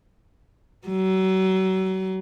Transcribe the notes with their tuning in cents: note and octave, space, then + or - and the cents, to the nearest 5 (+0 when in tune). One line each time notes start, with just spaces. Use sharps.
F#3 +35